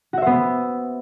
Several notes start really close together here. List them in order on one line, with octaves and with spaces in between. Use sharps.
F#4 E5 C5 B3